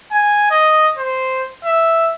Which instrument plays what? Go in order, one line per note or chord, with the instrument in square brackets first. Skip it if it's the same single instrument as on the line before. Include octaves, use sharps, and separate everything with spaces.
[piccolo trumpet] G#5
D#5
C5
E5